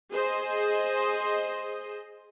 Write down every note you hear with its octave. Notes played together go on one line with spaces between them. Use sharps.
G#4 C5 D#5